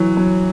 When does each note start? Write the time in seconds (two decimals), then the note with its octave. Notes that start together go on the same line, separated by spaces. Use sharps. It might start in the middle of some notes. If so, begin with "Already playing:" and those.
Already playing: E3 F#3 C#5
0.17 F#3